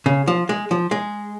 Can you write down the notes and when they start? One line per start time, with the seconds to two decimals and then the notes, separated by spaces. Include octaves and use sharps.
0.06 C#3
0.27 F3
0.49 G#3
0.71 F3
0.91 G#3